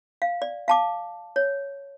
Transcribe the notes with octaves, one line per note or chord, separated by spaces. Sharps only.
F5
D5
F5 A5 D6
C#5